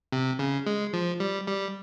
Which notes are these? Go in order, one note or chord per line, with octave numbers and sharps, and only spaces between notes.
C3
C#3
G#3
F3
G3
G3